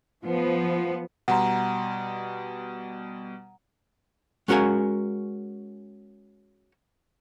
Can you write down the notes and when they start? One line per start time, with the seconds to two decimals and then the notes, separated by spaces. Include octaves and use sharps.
0.25 F3 B3
1.28 B2 G3 F#5 A#5 C6
4.48 G#3 C#4 F#4 A#4 F5 G#5